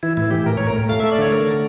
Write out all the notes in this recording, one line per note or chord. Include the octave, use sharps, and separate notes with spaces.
E3 E4
A2 E4
E3 G4
A2 A#4
A2 C#5
A#4
A2
A3 F5
A3 E5
D5
D3 C#5
A3 A#4
D3